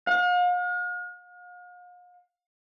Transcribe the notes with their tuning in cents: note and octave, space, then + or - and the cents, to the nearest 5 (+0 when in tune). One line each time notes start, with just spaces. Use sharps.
F5 +45